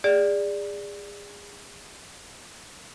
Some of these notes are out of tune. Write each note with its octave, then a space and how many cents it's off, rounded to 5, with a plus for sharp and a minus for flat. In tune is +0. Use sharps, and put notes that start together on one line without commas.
G#4 -30 D5 +0